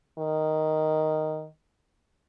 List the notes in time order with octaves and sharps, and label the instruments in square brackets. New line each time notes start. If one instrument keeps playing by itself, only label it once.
[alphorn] D#3